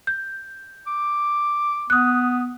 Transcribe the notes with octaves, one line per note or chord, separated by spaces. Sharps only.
G6
D6
B3 D#6 F#6